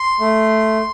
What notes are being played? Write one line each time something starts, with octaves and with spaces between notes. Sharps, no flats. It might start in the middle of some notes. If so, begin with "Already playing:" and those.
Already playing: C6
A3